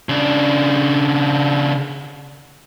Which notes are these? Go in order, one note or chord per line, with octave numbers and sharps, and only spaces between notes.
C#3 D4